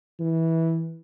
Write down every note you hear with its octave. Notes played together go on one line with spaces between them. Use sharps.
E3